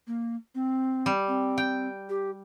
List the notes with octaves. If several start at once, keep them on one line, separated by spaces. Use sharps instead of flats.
A#3
C4
G3
C4
G5
G4